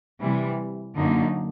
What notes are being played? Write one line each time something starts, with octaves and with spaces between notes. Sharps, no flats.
C3 E3 G3
F#2 D3 F#3 A#3 D#4